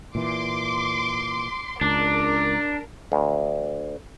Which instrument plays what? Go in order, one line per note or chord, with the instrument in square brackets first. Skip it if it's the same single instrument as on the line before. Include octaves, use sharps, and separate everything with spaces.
[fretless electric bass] A#2 E3 [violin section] C6 D6
[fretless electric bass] C#2 [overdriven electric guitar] D4 [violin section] A#4
[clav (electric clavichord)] D2